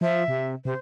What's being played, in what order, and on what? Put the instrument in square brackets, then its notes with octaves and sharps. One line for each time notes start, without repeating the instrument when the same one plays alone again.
[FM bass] F3 [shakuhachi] E5
[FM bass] C3
[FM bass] C3 [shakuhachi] C5